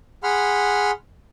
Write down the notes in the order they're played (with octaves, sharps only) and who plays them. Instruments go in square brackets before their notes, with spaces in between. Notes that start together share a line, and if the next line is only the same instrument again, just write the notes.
[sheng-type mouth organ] G#4 F#5 B5 C6 F6